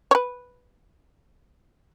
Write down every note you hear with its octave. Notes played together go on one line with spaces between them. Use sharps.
C#5
B4